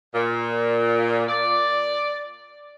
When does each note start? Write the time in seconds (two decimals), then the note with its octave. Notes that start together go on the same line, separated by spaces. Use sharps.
0.14 A#2
1.29 D5